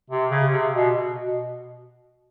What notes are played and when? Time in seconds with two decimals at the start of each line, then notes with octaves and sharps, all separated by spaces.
0.10 C3
0.31 C#3
0.52 C3
0.74 B2
0.94 B2
1.22 B2